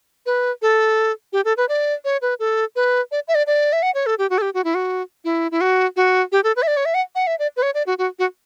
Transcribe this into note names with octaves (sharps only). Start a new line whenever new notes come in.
B4
A4
G4
A4
B4
D5
C#5
B4
A4
B4
D5
E5
D5
D5
E5
F#5
C#5
A4
G4
F#4
A4
G4
F#4
E4
F#4
E4
E4
F#4
F#4
G4
A4
B4
E5
D5
C#5
E5
F#5
F#5
E5
D5
B4
C#5
D5
F#4
F#4
F#4